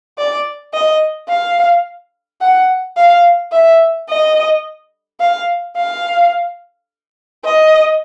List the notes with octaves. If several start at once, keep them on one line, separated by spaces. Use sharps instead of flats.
D5
D#5
F5
F#5
F5
E5
D#5
F5
F5
D#5